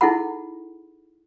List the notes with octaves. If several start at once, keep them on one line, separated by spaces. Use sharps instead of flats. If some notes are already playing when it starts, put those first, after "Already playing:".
D#4 E4 G#4 A4 F#5 B5